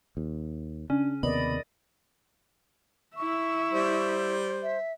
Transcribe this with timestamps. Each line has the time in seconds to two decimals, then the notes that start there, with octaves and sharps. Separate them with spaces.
0.17 D#2
0.90 C#3 C#4 D4
1.23 D#2 C3 B3 A#4 D5 D#5 B5
3.17 E4 E5 C#6
3.72 G3 C5
4.63 E5